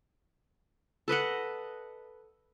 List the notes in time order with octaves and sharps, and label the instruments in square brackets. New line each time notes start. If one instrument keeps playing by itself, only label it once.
[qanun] A4 B4 D#5 F#5